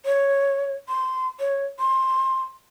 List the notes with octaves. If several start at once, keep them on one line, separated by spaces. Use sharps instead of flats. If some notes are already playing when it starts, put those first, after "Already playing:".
C#5
C6
C#5
C6